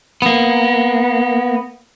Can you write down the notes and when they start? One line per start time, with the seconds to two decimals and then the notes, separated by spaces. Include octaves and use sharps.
0.22 A#3 B3